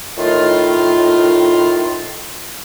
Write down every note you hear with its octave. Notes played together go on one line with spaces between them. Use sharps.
A2 D#3 F4